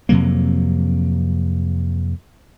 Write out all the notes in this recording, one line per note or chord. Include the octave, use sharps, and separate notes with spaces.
F2 C3 F#3 A#3